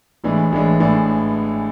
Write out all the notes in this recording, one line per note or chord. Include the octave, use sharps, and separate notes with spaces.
A1 A2 E3 G#3 D4
A1 A2 E3 G#3 D4
A1 A2 E3 G#3 D4